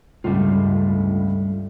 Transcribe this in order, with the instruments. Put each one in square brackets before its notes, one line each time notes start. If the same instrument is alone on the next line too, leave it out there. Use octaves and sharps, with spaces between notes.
[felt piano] G1 C#2 A2 [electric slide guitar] G3 A3 F4